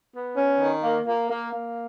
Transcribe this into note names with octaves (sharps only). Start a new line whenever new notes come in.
B3
C#4
D#3
A#3
A#3
A#3
A#3